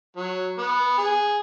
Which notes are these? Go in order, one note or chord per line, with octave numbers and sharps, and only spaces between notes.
F#3
B3
G#4